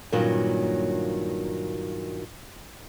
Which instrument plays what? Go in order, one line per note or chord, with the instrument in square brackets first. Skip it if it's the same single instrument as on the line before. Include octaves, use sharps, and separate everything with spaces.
[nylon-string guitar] G2 A#2 D#3 F#3 A#3 C#4